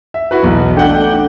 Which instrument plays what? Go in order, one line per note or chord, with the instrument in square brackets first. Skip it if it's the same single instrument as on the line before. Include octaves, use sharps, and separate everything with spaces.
[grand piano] E5
E4 F#4 B4
B1 E2
[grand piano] A3 F#5 [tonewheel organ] D4 G5